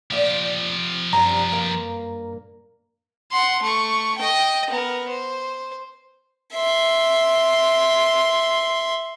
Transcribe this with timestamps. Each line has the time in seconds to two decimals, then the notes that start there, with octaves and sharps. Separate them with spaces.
0.11 A#2 F3 F4 G4 D5
1.13 F#2 G3 C4 D4 A#5
1.51 G2 A#3 F5
3.31 F#5 C6
3.63 A3 C#6
4.18 D#5 G5
4.71 B3 A#4
5.09 C5
6.54 E5 C6